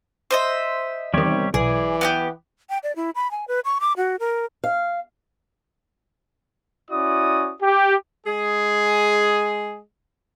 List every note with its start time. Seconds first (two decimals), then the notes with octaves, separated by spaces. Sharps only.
0.31 C5 D#5 E5
1.14 E2 C3 D#3 G3 G4 C#5
1.54 B1 E3 G#4 D5
2.01 B3 D#4 G4
2.70 G5
2.83 D5
2.96 E4
3.15 B5
3.31 G#5
3.48 B4
3.65 C#6
3.80 D6
3.97 F#4
4.20 A#4
4.64 F5
6.90 C#4 E4 F#4 D5 D#6
7.61 G4
8.27 G#3 G#4